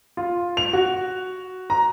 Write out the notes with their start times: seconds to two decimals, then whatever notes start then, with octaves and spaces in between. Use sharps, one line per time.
0.17 F4
0.57 F7
0.73 F#4
1.70 A#5